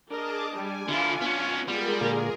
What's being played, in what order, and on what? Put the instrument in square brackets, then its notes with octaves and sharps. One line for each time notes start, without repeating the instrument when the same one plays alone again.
[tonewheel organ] D4 [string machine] G#4 A5 D6 [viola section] A#4 D#5
[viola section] G3 [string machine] G#5
[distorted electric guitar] D3 E4 [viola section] F4
[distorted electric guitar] B3 C#4
[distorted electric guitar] G3 [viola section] G#3 F4 [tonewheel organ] B3 [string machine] G#4 A#4
[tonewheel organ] A#2 D3 A#3